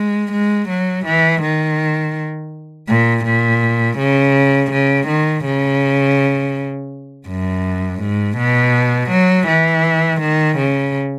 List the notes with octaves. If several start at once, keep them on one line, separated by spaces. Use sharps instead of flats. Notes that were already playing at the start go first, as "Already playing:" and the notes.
Already playing: G#3
G#3
F#3
E3
D#3
A#2
A#2
C#3
C#3
D#3
C#3
F#2
G#2
B2
F#3
E3
D#3
C#3